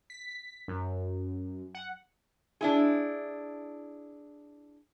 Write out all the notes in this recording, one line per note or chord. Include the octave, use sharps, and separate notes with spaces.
B6
F#2
F#5
D4 E4 G#4